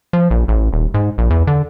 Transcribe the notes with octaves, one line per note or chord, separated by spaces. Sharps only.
F3
A#1
A1
D#1
G#2
A#1
E2
D3